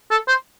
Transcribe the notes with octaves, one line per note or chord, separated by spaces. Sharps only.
A4
C5